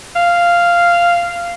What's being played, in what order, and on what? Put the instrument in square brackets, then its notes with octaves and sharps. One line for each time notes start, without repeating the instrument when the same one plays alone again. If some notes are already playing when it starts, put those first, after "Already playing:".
[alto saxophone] F5